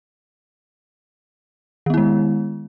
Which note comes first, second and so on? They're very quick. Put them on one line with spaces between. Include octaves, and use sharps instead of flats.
D#3 B3 E4 G#3